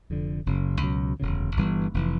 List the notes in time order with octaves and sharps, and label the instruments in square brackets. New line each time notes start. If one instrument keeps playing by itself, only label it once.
[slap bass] F1 F2 D3
F#1 F#2 C#3
C#2 B2 F#3
E1 D2 C#3
G1 G2 E3 G3
F1 C3 E3